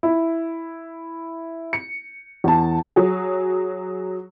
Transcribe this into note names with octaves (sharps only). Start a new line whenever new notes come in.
E4
C#7
E2 A5
F#3 G#4